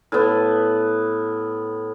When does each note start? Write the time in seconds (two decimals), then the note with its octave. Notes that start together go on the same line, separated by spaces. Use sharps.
0.12 A2 B3